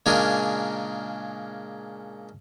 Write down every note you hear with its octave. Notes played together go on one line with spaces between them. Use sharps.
A#2 C#3 G#3 D4 G#4 A#4